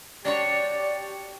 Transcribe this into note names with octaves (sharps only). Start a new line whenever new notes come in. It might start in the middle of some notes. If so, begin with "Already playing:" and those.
D4 F#4 G4 C#5 D5